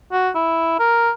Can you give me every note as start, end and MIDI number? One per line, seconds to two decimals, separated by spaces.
0.12 0.30 66
0.35 0.78 64
0.79 1.11 70